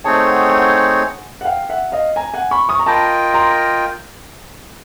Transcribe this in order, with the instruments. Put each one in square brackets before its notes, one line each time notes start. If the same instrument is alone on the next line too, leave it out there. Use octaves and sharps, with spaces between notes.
[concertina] A3 C4 D#4 G#4 C#5 [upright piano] G5 A5
[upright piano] F#5 G#5
F#5 G#5
F#5
F5 G5
E5 F#5
D#5 F5
G#5 A#5
F#5 G#5
B5 C#6
C#6 D#6
A#5
[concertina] F4 A#4 D#5 G5 [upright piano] A5 B5
[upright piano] A#5 C6